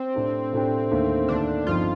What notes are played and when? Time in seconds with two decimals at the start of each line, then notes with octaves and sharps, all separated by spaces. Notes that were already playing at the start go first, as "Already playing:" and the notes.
Already playing: C4
0.14 A2 A3 D4 G4
0.53 A2 A3 D4 G4
0.91 D#2 D3 A3
1.28 D#2 D3 A3 D4
1.67 G1 G2 F3 C4 D#4 F4